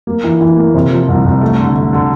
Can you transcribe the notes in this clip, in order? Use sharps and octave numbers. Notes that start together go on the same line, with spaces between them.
A#3
E3
E3
A#3
C3
F3
C2
C2
A3
D3
A3
D3